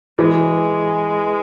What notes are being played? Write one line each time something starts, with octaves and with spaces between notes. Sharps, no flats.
E3 G#3